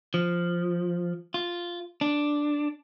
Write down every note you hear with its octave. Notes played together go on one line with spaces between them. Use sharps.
F3
F4
D4